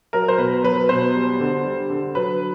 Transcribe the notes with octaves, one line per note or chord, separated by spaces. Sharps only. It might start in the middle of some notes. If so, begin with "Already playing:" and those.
F#3 A#4
C5
B2 B4
F#3 B4
B2 C5
G3
D3
G3
D3
F#3 B4